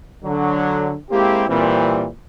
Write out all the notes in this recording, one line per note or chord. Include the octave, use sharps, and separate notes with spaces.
D3 F#3
G#3 A#3 C4 E4 G4
A#2 E3 G3 C4